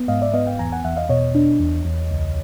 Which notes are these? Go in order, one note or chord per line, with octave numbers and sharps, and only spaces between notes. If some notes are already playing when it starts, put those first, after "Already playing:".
Already playing: B3
G#2 D#5 F5
D5 E5
B3 D#5 F5
F5 G5
E2 G#5 A#5
F#5 G#5
E2 E5 F#5
D#5 F5
B2 C#5 D#5
D4
E2
E2
C#2